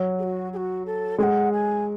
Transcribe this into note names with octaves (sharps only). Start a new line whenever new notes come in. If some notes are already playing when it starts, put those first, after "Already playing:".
Already playing: F#3
G#4
F#4
G#4
F#4
A4
G#3 F#5 G#5
G#5